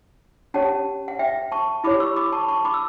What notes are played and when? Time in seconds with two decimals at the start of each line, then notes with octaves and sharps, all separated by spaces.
0.54 C#4 G4 C#5 F#5 A5
1.08 F#5
1.19 E5 G5
1.52 A5 C#6
1.84 E4 G4 C#5 B5 D6
2.00 C#6 E6
2.16 B5 D6
2.32 A5 C#6
2.48 A5 C#6
2.65 B5 D6
2.74 E6